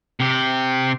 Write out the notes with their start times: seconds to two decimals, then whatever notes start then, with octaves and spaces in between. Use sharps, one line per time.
0.20 C3 G4